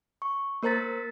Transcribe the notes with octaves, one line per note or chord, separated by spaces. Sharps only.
C#6
A#3 A#4 C5 A#5 A6 B6